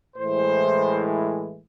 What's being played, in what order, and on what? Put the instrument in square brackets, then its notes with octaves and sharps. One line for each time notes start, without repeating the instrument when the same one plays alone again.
[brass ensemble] A2 E3 G#3 C5